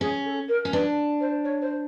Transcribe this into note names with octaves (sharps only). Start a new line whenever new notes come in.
C#4 G#4
A4
A#4
C#4
D4 B4
C5
C#5
C5